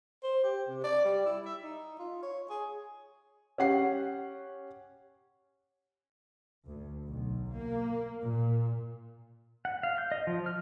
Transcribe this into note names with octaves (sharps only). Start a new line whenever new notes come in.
C5
G4
C3
D5
G3
E4
E5
D#4
F4
C#5
G#4
C#4 G4 F#5 C7
D2
B1
A#3
A#2
F#5
F5
G6
D#5
F3
F6